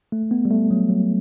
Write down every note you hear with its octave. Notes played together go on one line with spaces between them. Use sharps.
A3
B3
G3
A3
F#3
F#3